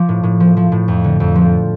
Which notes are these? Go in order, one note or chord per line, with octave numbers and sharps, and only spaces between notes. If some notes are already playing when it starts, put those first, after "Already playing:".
Already playing: F3 D6
A2
A2
F3
F3
A2
F2
D3
F2
F3